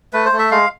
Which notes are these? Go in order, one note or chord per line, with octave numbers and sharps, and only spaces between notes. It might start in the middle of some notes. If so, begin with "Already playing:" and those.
A3 B4
C5
A3
E5
G#3 F5